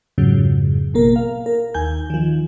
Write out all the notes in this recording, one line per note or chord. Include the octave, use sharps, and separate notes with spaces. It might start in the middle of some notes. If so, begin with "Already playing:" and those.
F2 G#2 C#3 F#3
G#1 B2 A#3 A#4
F5
A#4
D#2 G#5 G6
D#3 F3